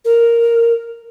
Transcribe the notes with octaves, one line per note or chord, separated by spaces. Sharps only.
A#4